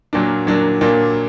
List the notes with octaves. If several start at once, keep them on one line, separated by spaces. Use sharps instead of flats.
A#2 F#3 A#3 D4
A#2 F#3 A#3 D4
A#2 F#3 A#3 D4